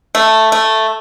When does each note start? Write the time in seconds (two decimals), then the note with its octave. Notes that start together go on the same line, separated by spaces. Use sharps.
0.15 A3
0.52 A3